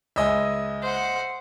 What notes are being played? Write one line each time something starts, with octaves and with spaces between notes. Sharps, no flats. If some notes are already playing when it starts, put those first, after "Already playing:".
C#2 G#3 D#5 E5 G#5
C5 F#5